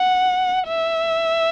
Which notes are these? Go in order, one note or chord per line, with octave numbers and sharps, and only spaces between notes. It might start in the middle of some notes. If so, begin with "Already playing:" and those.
Already playing: F#5
E5